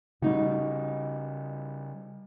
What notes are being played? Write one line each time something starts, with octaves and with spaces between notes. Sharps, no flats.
C#3 G3 D#4 F#4